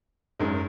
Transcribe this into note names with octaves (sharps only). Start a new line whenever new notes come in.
G#1 F#2 D#3 G#3